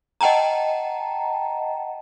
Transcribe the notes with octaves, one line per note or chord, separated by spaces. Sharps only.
D#5 F#5 G5 A5 A#5